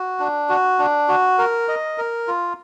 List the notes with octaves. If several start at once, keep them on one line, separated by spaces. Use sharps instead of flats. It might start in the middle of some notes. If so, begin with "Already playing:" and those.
Already playing: F#4
D4
F#4
D4
F#4
A#4
D#5
A#4
F4